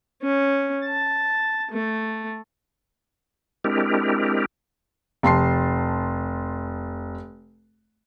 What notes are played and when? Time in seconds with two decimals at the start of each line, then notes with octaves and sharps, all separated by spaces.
0.23 C#4
0.85 A5
1.71 A3
3.64 G#3 C4 D4 E4 G4 A#4
5.23 F1 A5 C6 C7